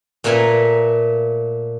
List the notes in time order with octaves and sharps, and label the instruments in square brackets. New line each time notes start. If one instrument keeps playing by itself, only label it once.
[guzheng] A#2 A3 A#4 B4 G#5